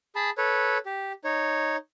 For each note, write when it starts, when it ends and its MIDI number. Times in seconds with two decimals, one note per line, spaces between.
0.16 0.30 68
0.16 0.30 81
0.16 0.30 83
0.38 0.78 69
0.38 0.78 71
0.38 0.78 73
0.86 1.13 67
1.25 1.76 63
1.25 1.76 73